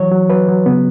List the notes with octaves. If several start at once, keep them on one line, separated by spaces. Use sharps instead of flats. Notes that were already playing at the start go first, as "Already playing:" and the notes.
Already playing: E3 F#3 C#5
F#3
F#3 B4
F#3
C#3 B3